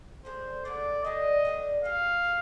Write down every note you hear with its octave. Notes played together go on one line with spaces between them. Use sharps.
D3 G#3 D4 C5
D3 G#3 D4 D5
D3 G3 D4 D#5
D3 G3 D4
G#3 D#4 G4 F5
G#3 D#4 G4